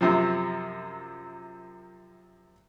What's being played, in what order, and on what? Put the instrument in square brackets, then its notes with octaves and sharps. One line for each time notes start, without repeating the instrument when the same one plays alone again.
[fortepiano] F#2 C3 F3